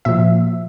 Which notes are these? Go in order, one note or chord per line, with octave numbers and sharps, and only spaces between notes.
A#2 F3 E5